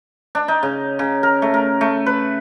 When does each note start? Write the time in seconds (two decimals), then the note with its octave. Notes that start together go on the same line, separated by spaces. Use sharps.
0.35 D4
0.48 D#4
0.63 C#3
0.99 C#3
1.23 A#4
1.42 A3
1.54 A#4
1.81 A3
2.06 B4